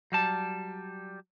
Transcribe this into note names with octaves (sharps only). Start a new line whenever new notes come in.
F#3 G3 A5